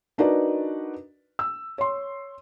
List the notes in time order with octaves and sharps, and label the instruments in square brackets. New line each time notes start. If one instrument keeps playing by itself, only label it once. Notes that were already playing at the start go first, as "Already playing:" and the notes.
[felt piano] D4 D#4 F#4 A#4 B4 D5
E6
C#5 C6